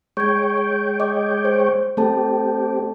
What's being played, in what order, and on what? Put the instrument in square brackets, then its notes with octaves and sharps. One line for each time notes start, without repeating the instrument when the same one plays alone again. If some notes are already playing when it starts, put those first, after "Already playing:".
[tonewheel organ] G#3 C#5 G5 [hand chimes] C#6 G#6
[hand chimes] D#5 D6
C5
[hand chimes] A3 A4 A5 [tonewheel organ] C4 G4